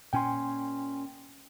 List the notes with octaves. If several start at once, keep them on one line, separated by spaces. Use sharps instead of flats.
A#2 C#4 G5 G#5 C6